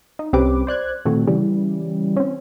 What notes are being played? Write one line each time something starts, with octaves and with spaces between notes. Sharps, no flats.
D#4
C2 C4 C#4 G4 B4 D6
C5 D5 F#6 G#6
A#2 D#3 A3 C4 F#4
C#3 E3 G3
C4 C#4